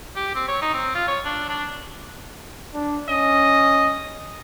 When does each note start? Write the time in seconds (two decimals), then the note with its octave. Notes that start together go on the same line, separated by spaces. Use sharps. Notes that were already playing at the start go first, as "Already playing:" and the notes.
0.16 G4
0.35 C4
0.48 C#5
0.62 D#4
0.74 C4
0.95 F4
1.08 C#5
1.25 D4
1.49 D4
2.74 D4
3.09 C#4 D#5